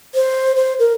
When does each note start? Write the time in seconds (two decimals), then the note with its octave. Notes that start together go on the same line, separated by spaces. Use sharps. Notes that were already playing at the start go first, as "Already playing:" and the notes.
0.15 C5
0.56 C5
0.79 A#4